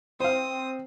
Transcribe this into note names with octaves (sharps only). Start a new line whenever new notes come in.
C4 C5 F5 D#6